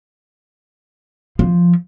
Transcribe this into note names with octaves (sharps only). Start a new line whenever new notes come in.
F3